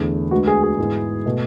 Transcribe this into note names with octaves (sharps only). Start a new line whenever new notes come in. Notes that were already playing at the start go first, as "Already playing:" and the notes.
Already playing: E2 D3 A3
D2 D3 G#3 B3 F#4
G#4
G#4
G#2 E3 G#3 B3
B2 A3